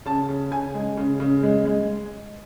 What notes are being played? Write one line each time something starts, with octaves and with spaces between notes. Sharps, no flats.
C#3 A5
C#3
C#3 G#5
G#3
C#3
C#3
G#3
G#3